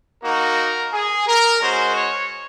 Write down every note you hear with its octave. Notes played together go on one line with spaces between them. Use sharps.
A#3 D#4 F#4 A#4
G#4
A#4
G#3 C#4 F#4 C5
C#5